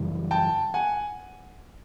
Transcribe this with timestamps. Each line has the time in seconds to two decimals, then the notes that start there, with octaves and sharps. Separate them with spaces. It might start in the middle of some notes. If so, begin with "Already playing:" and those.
Already playing: F#2 C#3 E3 G3
0.31 G5 A5
0.74 F#5 G#5